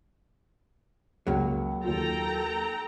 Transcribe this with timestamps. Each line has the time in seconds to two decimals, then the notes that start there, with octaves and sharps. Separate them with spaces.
1.27 C#2 F#3 A#3
1.84 D#2 F4 A4 G5 A#5